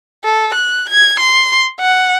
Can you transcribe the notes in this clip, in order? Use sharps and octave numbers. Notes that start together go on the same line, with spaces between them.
A4
F#6
G#6
C6
F#5